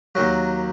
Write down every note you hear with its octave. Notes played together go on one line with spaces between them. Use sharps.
D#2 D#3 F#3 F#4